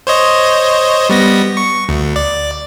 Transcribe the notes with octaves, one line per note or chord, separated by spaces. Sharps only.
C5 C#5 D#5
G3 B3 A#6
C#6
D2
D5